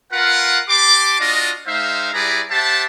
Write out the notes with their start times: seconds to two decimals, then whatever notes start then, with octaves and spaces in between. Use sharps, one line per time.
0.13 F4 A#4 B4 F5 F#5
0.69 G4 A5 C6 D6
1.20 D4 F4 F#4 D5 D#5
1.67 G#3 D#4 C5 E5 F5
2.13 G3 E4 G#4 B4 D5 A#5
2.50 G4 C5 E5 F#5 A5